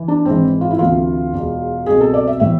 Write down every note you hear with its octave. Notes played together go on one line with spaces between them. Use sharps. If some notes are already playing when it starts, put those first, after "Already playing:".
Already playing: E3
D4
G#1 G#2 E3 C4
F4
E4
D2 C3 E3 F4
E1 E2 B2
C2 B2 G#4
A4
D5
E5
A2 E3 E5